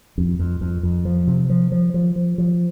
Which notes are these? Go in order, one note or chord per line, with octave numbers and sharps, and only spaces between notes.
F2
F2
F2
F2
F3
C3
F3
F3
F3
F3
F3